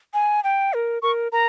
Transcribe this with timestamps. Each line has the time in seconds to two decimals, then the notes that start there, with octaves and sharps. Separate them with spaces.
0.14 G#5
0.44 G5
0.74 A#4
1.02 A#4 C#6
1.32 A#4 A#5